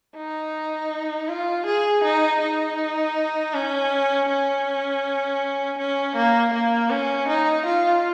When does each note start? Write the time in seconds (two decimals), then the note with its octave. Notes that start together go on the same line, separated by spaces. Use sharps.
0.16 D#4
1.28 F4
1.66 G#4
2.04 D#4
2.41 D#4
3.54 C#4
4.29 C#4
5.78 C#4
6.16 A#3
6.53 A#3
6.91 C#4
7.28 D#4
7.66 F4